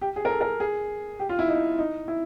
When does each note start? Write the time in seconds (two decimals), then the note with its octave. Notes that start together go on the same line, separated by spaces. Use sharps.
0.01 G4
0.16 G#4
0.25 A#4
0.30 A4
0.41 A#4
0.60 G#4
1.19 G4
1.29 F4
1.39 E4
1.48 D#4
1.78 D#4
2.08 E4